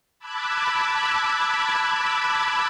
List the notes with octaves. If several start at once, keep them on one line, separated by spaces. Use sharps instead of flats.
A5 B5 D6 E6 F#6 G#6